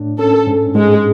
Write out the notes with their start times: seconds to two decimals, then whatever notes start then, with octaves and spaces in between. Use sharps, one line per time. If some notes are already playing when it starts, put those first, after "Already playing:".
Already playing: A2 D4
0.19 C#4 A4
0.47 G#2
0.75 G#2 G#3